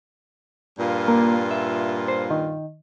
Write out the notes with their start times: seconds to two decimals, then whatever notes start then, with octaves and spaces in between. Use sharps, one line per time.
0.79 G2 A#2 F4
1.08 A#3
1.51 E5
2.08 C5
2.31 D#3